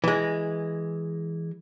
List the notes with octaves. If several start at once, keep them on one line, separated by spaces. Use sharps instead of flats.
E3 G#3